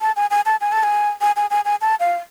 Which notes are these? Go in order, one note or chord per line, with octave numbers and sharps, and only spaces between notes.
A5
G#5
G#5
A5
G#5
A5
G#5
G#5
G#5
G#5
G#5
A5
F5